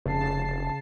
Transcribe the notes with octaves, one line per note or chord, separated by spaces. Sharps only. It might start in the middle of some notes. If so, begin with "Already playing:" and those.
F1 C#3 A5 C7